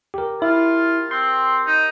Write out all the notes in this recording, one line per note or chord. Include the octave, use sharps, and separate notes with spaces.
G4 A#4
E4 F4
C4 C6
D#4